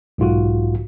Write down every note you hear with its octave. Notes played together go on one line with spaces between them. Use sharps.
B1 G#2 F4 F#4